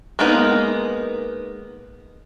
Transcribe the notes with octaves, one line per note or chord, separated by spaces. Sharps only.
G#3 A#3 B3 D#4